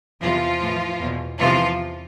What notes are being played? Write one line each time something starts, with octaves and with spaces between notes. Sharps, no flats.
E2 C3 E3 F3 F4
A2 E3
E2 B2
E2 C3 E3 F3 F4